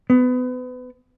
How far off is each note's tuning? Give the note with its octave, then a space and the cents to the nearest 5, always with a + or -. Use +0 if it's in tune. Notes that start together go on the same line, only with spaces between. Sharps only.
B3 +30